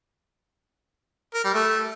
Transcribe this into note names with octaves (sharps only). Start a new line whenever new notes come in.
A#4
G3
A3